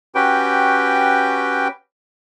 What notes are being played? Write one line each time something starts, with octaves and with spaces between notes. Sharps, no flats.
C#4 F#4 G4 B4 G5